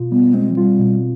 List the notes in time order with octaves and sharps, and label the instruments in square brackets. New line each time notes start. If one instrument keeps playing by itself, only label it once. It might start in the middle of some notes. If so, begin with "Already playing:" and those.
Already playing: [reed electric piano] B2 F4
[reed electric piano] G3 [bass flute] B3
[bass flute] G#3 [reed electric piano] C4
[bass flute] F3
[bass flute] G3 [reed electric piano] F4
[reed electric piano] B2